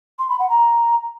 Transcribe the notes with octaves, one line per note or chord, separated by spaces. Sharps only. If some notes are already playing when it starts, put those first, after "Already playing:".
C6
B5
F#5
A#5